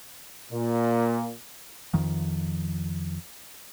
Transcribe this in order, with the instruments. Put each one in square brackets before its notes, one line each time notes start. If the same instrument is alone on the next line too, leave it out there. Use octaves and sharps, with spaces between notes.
[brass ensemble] A#2
[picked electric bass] F2 D#3 F3